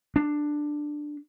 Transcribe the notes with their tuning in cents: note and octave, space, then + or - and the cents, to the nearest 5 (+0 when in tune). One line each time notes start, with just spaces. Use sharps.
D4 +10